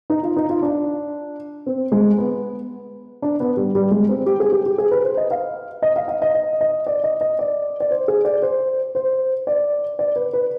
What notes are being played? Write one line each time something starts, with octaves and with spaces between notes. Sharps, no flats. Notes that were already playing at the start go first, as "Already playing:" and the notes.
D#4
F4
D#4
F4
D4
C4
G#3
B3
D4
B3
G3
G3
G#3
C4
G4
G#4
G4
G4
G#4
B4
C5
D#5
F5
D#5
F5
F5
D#5
D#5
D#5
D5
D#5
D#5
D5
D5
C5
G#4
D5
C5
C5
D5
D5
B4
B4